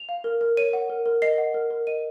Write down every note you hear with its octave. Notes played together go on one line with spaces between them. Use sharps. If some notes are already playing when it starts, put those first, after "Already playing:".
Already playing: F7
F5
A#4
A#4
C#5 D#7
F#5
A#4
A#4
D#5 C7
F#5
A#4
A#4
D#5 D#7